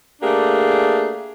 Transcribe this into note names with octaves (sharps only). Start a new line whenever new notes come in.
A3 A#3 D4 G4 G#4